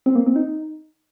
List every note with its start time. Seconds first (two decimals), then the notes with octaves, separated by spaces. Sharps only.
0.06 C4
0.15 A#3
0.26 C4
0.36 D#4